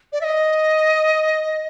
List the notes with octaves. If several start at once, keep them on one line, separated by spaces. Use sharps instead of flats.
D5
E5
D#5